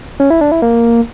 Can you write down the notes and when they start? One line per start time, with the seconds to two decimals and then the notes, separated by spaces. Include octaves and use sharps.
0.20 C#4
0.30 E4
0.41 D4
0.52 E4
0.62 A#3